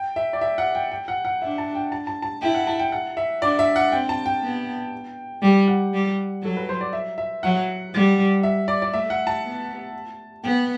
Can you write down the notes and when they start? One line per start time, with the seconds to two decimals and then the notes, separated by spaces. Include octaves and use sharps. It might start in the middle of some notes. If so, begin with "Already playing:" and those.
Already playing: G5
0.16 E5
0.33 D5
0.41 E5
0.58 F#5
0.75 G5
0.92 G5
1.08 F#5
1.25 F#5
1.42 D4 E5
1.58 A5
1.75 G5
1.92 A5
2.07 A5
2.22 A5
2.41 E4 G5
2.54 F#5
2.67 A5
2.79 G5
2.92 F#5
3.17 E5
3.42 D4 D5
3.59 E5
3.76 F#5
3.92 C4 G5
4.09 A5
4.26 G5
4.42 B3
5.42 G3 G5
5.68 F#5
5.93 G3
6.42 F#3 A4
6.57 B4
6.69 C5
6.81 D5
6.93 E5
7.18 E5
7.43 F#3 F#5
7.94 G3
8.43 E5
8.68 D5
8.82 D5
8.93 A3 E5
9.10 F#5
9.27 A5
9.44 B3
10.43 B3 G5